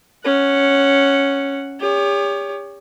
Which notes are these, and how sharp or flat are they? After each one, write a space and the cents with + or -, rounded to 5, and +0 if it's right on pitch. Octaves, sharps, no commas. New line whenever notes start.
C#4 +0 F#5 +0
G4 +40 C#5 +35